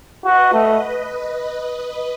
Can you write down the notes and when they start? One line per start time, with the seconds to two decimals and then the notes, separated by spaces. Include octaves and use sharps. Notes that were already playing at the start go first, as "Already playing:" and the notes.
0.24 F#4 B4 D#5
0.53 A3